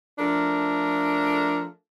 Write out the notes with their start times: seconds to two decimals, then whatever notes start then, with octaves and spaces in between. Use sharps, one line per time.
0.19 F3 A3 D4 A4 A#4